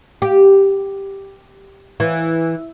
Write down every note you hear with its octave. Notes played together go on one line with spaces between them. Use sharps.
G4
E3